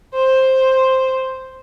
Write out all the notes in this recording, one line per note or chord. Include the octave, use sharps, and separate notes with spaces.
C5